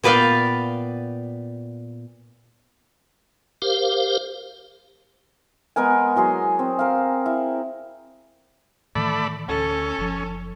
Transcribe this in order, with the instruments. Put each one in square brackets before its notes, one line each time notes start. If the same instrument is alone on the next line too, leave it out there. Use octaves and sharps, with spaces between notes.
[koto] A#2 B3 B4 D5 F5 G5
[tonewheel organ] G4 A#4 C5 F5
[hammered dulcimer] G#3 B3 A#4 G#5
E3 F#3 G#4 C6
C4
A#4 F5
E4
[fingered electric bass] A2 D#3 E3 [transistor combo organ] A3 D5 B5
[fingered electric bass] D2 [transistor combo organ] C#4 [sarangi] A4
[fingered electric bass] F#1 F3